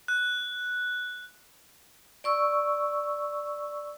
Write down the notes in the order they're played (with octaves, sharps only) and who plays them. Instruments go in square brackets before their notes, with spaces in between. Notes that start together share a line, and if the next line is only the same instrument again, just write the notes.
[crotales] F#6
[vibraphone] D5 C#6 E6